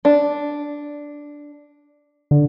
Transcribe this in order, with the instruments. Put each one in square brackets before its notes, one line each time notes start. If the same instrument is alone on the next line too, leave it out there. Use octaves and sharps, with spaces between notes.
[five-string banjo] D4
[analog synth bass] D3